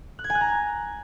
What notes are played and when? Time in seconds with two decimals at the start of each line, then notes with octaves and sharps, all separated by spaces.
0.19 F#6
0.24 G#6
0.30 G#5
0.35 F#6
0.41 A#5